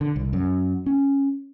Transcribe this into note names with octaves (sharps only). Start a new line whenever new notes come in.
D3
C2
F#2
C#4